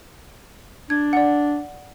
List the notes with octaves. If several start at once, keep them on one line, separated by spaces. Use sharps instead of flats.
D4 G#6
D5 F#5